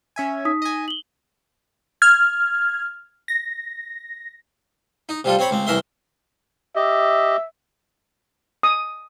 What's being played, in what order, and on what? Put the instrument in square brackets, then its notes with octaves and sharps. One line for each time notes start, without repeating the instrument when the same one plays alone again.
[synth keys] C#4 E5 G#5
[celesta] D#4 D#6 B6
[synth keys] D#5 G#5
[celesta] F#7 G7
[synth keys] F6 G#6
A#6
[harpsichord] D#4
C3 G3 F4 A4
C4 C#5 B5
C#2 C4
C2 E3 A#4 E5 C6
[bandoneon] G4 D#5 [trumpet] E5
[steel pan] D#6